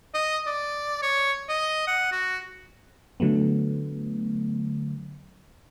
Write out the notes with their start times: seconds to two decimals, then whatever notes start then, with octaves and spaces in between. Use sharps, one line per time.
0.14 D#5
0.47 D5
1.02 C#5
1.49 D#5
1.88 F#5
2.12 F#4
3.20 D3 F#3 A3 B3